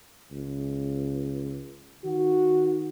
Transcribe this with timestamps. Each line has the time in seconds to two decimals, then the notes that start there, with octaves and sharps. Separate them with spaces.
0.32 C#2
2.05 D#3 F#4